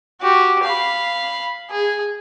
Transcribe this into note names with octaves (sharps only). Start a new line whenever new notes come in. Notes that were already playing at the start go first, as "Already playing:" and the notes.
F#4 G4
F5 B5
G#4